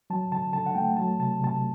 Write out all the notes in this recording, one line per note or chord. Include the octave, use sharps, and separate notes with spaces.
F#3 A5
D3 A5
D3 A5
F#5
A3 G5
F#3 A5
C3 A5
C3 A5